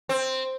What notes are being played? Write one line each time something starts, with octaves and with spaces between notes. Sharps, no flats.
C4